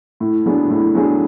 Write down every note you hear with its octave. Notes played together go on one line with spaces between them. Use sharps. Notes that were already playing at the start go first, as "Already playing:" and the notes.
A2
F#3 B3 D4 G#4
A2
F#3 B3 D4 G#4